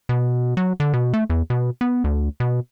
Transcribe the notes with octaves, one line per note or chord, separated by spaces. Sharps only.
B2
F#3
D3
B2
A3
E2
B2
B3
D2
B2